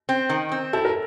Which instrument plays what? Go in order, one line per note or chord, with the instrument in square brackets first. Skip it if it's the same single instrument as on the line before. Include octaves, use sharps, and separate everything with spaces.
[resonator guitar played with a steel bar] C4
D#3
C4
[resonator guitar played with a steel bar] E4 [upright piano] A4
[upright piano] A#4